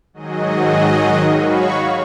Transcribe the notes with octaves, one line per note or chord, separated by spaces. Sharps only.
G#2 D#3 F#3 F#4 G#4 D#5
F#4 C#5 F5 B5 C#6